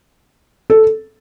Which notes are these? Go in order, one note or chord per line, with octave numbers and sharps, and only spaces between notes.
A4